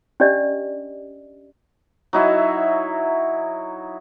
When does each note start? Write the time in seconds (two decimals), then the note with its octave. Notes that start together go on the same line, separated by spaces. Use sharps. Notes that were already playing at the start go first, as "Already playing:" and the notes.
0.20 C#4 D4 G4 D5 D#5
2.13 F#3 D#4 E4 E5